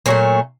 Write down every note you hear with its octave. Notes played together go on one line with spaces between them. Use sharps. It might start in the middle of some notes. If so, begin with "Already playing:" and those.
A#2 F#3 A3 A#3